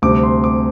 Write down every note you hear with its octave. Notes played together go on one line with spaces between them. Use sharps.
D2 C3 G3 C4 D6
C6
D6